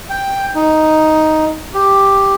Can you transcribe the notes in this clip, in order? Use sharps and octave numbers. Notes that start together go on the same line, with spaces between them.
G5
D#4
G4